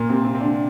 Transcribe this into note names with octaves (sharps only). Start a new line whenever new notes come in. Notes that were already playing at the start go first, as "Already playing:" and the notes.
Already playing: A#2 A#3
C3 C4
C3 C4
C4
D3 D4